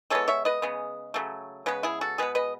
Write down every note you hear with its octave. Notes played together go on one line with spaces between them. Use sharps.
E3 G#3 B3 A4 C#5
C#5 E5
B4 D#5
C#3 G#3 B3
C#3 F#3 A3
C#3 G#3 B3 B4
E4 G#4
F#4 A4
B2 G#3 B3 G#4 B4
B4 D#5